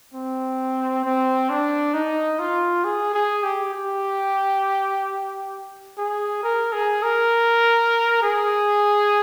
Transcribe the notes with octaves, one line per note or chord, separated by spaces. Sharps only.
C4
C4
D4
D#4
F4
G#4
G#4
G4
G4
G#4
A#4
G#4
A#4
G#4